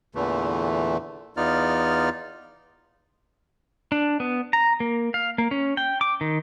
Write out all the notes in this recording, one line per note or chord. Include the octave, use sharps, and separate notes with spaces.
E2 A#2 D3 E3 A3
E2 B3 D#4 F4 D5 F6
D4
B3
A#5
A#3
F5
A#3
C#4
G5
D6
D#3